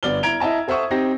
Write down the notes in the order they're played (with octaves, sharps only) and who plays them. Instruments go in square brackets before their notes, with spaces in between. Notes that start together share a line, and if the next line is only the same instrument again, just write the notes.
[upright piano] G1 B3 D5 F6 G7
E4 A#5 G#6 D7 F7
E4 D#5 E5 A5 A#5
A4 C5 E5 F#5 C#6 D#6
C4 D#4 G4 A#6